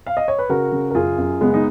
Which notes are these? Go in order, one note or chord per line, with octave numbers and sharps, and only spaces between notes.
F5
D#5
C#5
B4
C#3 F#4 A#4
C#3
A#4
F#2 F4 G#4
F#2
C#3 G#3 B3
D#4